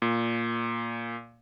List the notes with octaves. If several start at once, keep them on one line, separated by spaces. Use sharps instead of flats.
A#2